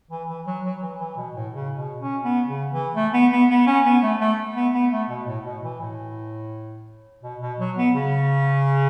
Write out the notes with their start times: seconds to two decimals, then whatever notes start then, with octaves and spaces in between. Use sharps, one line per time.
0.11 E3
0.28 E3
0.46 F#3
0.64 F#3
0.82 E3
1.00 E3
1.17 B2
1.35 A2
1.53 C#3
1.77 B2
2.00 C#4
2.24 B3
2.48 C#3
2.72 E3
2.95 A3
3.13 B3
3.31 B3
3.49 B3
3.67 C#4
3.85 B3
4.02 A3
4.21 A3
4.55 B3
4.74 B3
4.92 A3
5.10 B2
5.27 A2
5.45 B2
5.63 E3
5.81 A2
7.23 B2
7.41 B2
7.59 F#3
7.77 B3
7.95 C#3